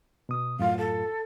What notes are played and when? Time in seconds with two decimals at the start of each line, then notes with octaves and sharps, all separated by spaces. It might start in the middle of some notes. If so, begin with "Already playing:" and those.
0.29 B2 D#6
0.59 F#2 A2 F4 F5
0.77 A4